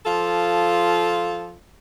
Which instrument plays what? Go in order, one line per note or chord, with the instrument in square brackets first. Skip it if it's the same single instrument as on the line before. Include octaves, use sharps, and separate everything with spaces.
[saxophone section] F3 F4 A4